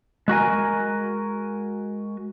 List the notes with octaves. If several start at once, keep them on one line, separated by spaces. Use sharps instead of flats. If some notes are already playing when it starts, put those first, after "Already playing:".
G#3 F#4 A#4 G#5